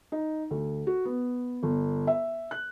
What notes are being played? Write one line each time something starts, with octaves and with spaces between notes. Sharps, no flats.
D#4
D2
F#4
B3
G1
E5
F#6